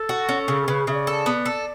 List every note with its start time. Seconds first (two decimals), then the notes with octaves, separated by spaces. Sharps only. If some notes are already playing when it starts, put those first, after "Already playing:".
Already playing: A4
0.09 F#4
0.29 C#4
0.48 C#3
0.62 A4
0.68 C#3 B4
0.87 C#3 E5
0.94 D5
1.07 A4
1.26 B3
1.46 A4